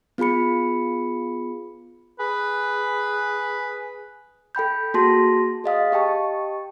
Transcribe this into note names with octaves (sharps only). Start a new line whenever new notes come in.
B3 F4 G#4 B5 C#7
G#4 B4
A4 G5 B5 G6
A#3 F#4 G#4 A5 C6 A#6
G#4 D#5 F5 D#6
G4 D#5 G5 A5 C#6